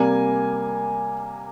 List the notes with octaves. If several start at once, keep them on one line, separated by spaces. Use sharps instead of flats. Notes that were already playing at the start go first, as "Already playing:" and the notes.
Already playing: C3 G3 A#3 G#5